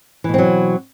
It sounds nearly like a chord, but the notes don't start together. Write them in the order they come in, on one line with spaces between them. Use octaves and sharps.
E3 B2 C4 F#3